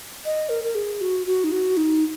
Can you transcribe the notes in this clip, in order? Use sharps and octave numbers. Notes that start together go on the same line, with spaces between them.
D#5
A#4
A#4
G#4
F#4
F#4
D#4
F#4
D#4